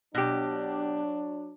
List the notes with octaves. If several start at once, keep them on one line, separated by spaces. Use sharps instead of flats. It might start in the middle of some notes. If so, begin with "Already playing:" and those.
B2 F#3 D4 G4